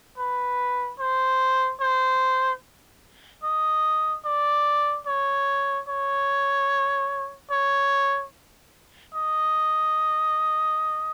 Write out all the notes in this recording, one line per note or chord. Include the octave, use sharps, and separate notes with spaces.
B4
C5
C5
D#5
D5
C#5
C#5
C#5
D#5